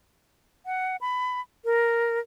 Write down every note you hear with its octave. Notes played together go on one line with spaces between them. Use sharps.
F#5
B5
A#4